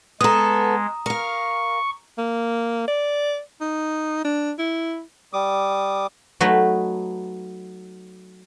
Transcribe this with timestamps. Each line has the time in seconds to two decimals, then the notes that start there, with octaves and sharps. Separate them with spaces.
0.21 G#3 B3 A4 A#5 D#6
1.06 A#4 F5 C#6
2.18 A#3
2.88 D5
3.61 D#4
4.24 D4
4.59 E4
5.33 G3 D6 D#6
6.40 F#3 A3 D#4 B4